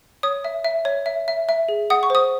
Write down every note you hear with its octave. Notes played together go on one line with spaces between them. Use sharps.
C#5 D#6
E5
E5
C#5
E5
E5
E5
G#4
F#5 D#6
C#6
C5 D#6